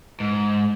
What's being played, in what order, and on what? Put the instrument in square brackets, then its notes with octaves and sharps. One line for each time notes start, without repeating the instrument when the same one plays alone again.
[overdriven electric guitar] G#2